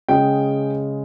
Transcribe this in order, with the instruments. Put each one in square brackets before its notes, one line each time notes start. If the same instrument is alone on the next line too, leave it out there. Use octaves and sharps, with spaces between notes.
[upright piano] C#3 G#3 G5